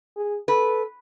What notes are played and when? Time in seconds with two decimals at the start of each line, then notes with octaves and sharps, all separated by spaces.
0.16 G#4
0.48 A4 B4